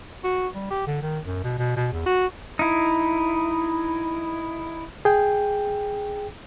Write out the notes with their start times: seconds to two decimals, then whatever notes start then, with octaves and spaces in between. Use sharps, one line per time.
0.24 F#4
0.55 G3
0.70 G4
0.87 D3
1.02 D#3
1.25 F#2
1.44 B2
1.59 B2
1.76 B2
1.92 E2
2.06 F#4
2.59 D#4 E4
5.05 G#4 G5